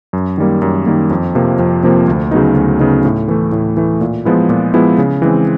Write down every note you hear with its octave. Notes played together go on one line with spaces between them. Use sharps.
F#2
D#3 G3 A#3
F#2
D#3 G3 A#3
F2
C3 F3 A#3
F2
C3 F3 A#3
D2
C#3 F#3 B3 D#4
D2
C#3 F#3 B3 D#4
A2
E3 A3
A2
E3 A3
A#2
F3 G#3 B3 E4
A#2
F3 G#3 B3 E4
C#3
E3 G#3 C4